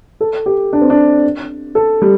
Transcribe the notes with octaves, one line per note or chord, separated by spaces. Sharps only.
A4
G4
D4
C4
D4
A4
G3